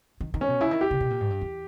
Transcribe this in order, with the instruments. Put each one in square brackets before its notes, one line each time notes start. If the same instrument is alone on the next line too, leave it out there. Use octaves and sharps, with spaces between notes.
[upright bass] D#3
D#3
[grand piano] C#4
[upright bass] B2
[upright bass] C#3 [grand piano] E4
[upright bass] D#3
[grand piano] G4
[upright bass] C#3
B2
A#2
G#2
G2
E2